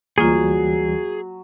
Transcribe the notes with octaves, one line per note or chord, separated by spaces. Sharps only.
D2 E3 F#3 G3 A#3 F4 G#4